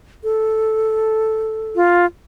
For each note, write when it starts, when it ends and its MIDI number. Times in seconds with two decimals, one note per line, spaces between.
0.24 1.77 69
1.76 2.06 65